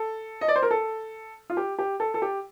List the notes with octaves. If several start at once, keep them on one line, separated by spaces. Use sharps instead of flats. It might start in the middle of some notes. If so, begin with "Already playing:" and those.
Already playing: A4
D#5
D5
C5
A#4
A4
F4
G4
G4
A4
A4
G4